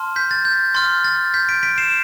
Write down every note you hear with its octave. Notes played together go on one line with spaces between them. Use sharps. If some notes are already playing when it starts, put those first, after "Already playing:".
Already playing: A5 C6 F6
G6 B6
A6
G6
C6 F6 A6
A6
G6 B6
B6 D7
B6 D7
C7 E7